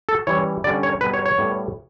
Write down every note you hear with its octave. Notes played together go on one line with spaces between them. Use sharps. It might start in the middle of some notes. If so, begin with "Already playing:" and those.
A4
E3 G3 C#4 C#5
D3 G3 C#4 D5
C#5
B2 G3 B3 B4
C#5
C#5
A2 G3 B3